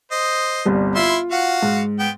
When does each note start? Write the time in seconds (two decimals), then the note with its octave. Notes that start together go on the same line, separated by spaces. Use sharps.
0.12 C5 D#5
0.66 G1 C2
0.96 E4 F4 E5 C6
1.31 F#4 F5 F#5
1.62 G#2
1.99 B3 G5